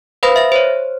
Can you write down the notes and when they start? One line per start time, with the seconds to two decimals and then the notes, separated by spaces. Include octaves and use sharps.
0.23 B4 C5 F5 B5 D#6 A#6
0.36 E5 A#6
0.52 C5 C#5